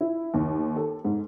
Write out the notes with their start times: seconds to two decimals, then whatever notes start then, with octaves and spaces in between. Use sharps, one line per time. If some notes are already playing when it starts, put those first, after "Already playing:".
0.01 E4
0.34 D#2
0.76 A4
1.05 G#2